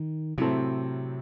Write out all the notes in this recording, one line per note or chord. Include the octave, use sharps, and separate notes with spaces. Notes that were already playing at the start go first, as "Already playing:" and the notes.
Already playing: D#3
A2 C3 F#3 C4 E4 A4